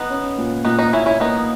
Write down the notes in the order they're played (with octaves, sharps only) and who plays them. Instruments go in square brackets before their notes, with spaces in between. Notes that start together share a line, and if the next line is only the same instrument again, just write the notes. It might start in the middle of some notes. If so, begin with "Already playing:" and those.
Already playing: [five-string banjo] B3 D#4
[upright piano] C#4
A#2
[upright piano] A#2 [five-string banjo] B3 D#4
[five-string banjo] B3 D#4
[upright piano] A#2 [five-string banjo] C#4 E4
[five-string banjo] C#4 E4
[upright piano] A#3 [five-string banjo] B3 D#4